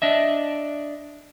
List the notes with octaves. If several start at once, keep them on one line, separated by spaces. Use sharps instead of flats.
D4 D#5 E5